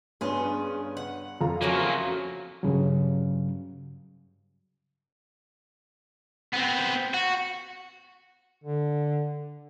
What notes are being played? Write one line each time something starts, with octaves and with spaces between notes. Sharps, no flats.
G2 B3 C#4 F4 G#4
F#5
F2 F4 A#5
C#3 F3 F#3 A3 A#3 F#4
G2 C#3 F#3
B3 C4
F#4
D3